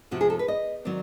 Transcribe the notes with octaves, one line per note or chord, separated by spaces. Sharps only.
F2 C3 F3 F#4
G#4
A4
B4
D#5
D#3 F#3 C4 D5